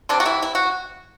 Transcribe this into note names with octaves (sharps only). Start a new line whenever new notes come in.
C3 G3 C4 D4
F#4
E3 E4
E4
F#4